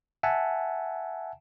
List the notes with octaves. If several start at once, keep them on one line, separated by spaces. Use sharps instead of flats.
E5 F#5 G#5 A5